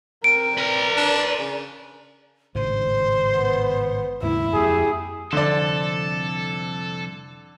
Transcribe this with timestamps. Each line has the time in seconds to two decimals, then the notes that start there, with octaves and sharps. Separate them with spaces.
0.24 C3 A#4 D7
0.58 A#4 B4 D5 A#5
0.97 D4
1.39 C#3
2.55 G#1 A2 C#3 C5
3.34 B3
4.23 D#2 G#2 C#3 E4 E5
4.54 F2 A#3 G4 G#4
5.33 C2 F2 D3 A4 D5 C6